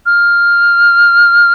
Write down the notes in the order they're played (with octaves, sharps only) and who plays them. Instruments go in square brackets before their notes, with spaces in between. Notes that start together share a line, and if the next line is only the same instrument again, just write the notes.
[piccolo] F6